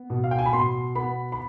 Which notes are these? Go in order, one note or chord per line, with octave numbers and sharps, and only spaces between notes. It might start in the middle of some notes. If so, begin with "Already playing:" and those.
Already playing: B3
B2
F5
G5
G#5
B5
B2 C6
B3 B5
B5